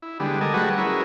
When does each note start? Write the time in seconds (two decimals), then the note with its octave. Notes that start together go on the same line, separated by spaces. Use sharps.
0.02 E4
0.20 D3 G3 G#3 B3
0.41 A4 A#4 D#5 G#5
0.54 F#3 G3 A3 F#4 G#4 B4
0.78 C#4 E4 G#4 A#4 B4